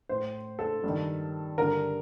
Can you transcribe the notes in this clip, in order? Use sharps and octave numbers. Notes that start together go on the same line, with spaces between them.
A2 C5
A4
G2 D#3
G2 D3 A#4